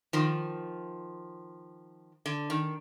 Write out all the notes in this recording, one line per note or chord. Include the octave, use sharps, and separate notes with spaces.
D#3 F3
D3
D#3